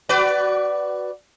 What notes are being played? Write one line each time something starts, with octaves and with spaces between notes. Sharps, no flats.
F#4 B4 D5